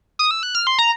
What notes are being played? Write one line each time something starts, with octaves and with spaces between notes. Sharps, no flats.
D#6
E6
F#6
F6
C6
A#5